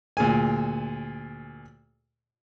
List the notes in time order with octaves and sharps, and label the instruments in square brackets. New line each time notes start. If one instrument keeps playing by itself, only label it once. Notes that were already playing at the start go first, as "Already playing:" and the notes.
[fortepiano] D2 A#2 G#4 G#5